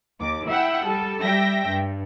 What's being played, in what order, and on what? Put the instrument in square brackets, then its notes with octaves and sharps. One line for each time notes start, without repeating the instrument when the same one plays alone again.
[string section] D#2 D6
E4 E5 F#5 G5
G3 A4
G3 E5 G5 A#6
G2